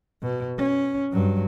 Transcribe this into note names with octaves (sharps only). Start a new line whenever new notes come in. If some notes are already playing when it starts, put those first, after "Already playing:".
B2
C#4
G2 F#3